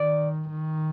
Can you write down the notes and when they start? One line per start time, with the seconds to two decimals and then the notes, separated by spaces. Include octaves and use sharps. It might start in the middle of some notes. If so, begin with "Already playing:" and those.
Already playing: D#3 D5
0.50 D#3